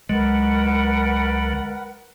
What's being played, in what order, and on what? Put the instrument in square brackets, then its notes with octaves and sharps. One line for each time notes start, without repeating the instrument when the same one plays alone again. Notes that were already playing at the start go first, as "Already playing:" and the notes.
[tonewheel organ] C#2 D3 F#3 [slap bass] G#3 [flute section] A#4 B4 F#5